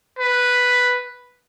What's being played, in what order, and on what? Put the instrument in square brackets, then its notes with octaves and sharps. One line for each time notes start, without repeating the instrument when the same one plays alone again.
[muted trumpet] B4